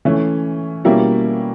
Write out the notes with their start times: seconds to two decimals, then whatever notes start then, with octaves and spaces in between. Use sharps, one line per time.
0.05 E3 A3 C#4
0.85 B2 G3 A#3 C#4 E4